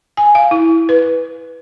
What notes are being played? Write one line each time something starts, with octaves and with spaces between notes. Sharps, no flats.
G#5
F5
E4
B4